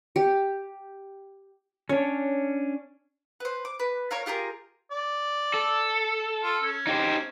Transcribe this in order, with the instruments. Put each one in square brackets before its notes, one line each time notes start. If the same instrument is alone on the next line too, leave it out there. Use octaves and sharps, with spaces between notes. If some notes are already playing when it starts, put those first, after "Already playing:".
[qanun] G4
[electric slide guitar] C#4 D4 [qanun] C#5
[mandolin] B4 C5
D6
B4
F4 A#4 C#5
F4 G4 G#4 A#4
[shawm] D5
[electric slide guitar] A4
[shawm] F4
C#4
[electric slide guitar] D#4 G4 C5